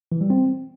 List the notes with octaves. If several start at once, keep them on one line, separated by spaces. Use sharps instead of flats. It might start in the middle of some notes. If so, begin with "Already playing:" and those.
E3
G3
C4